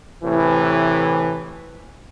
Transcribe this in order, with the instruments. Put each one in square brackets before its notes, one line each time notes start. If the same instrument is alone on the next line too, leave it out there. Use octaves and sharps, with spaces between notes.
[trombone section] A2 C3 E3